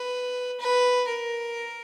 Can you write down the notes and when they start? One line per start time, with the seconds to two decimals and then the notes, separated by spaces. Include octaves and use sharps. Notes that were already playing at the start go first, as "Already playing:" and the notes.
Already playing: B4
0.60 B4
1.08 A#4